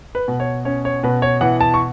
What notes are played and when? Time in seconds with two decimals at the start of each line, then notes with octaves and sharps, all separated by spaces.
0.15 B4
0.28 B2
0.40 C#5
0.65 C#4 C#5
0.85 C#5
1.03 B2 B4
1.22 C#5
1.41 E3 F#5
1.61 A5
1.74 C#6